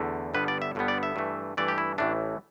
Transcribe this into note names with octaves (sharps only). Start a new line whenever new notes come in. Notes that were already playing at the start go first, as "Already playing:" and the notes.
Already playing: E2 D3 A3
G1 G2 D3 G3 B3 B4
D5
E5
G1 G2 D3 G3 B3
D5
E5
G2 E3 A3
G2 E3 A3 D5
G4
E4
A1 A2 E3 A3 D4